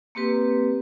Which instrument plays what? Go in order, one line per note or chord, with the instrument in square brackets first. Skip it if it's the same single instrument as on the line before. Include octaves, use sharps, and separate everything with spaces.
[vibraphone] A#3 C4 G4 B4